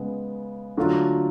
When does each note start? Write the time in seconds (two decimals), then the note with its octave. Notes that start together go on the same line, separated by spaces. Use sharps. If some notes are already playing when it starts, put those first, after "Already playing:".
Already playing: C#3 G#3 B3
0.77 D3 F#3 A3 F4